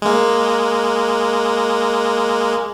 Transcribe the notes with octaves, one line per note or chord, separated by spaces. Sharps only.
G#3 A#3